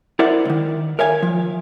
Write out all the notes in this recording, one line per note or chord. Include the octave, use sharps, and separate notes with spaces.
E4 A#4 C5 D5 E5 F#5
C#2 D#3
A#4 C#5 E5 F5 G#5
F3